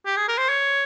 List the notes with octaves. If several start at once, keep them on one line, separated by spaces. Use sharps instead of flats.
G4
G#4
A#4
C5
C#5